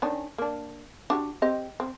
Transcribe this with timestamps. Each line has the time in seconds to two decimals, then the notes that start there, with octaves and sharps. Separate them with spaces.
0.02 D#3 C#4 D4
0.38 A#3 D4
1.10 D4 F#4 G4
1.42 C4 G4 D#5
1.80 C4